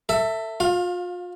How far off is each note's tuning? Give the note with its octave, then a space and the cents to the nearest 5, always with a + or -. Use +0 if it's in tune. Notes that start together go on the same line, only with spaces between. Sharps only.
A4 +30 E5 +0
F4 +40 F5 +15